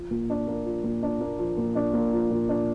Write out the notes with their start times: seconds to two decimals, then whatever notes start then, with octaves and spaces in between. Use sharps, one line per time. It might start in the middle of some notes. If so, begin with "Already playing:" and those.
Already playing: F3
0.11 A#2
0.30 D4
0.48 A#3
0.66 F3
0.84 A#2
1.03 D4
1.21 A#3
1.39 F3
1.57 A#2
1.75 D4
1.94 A#3
2.13 F3
2.31 A#2
2.49 D4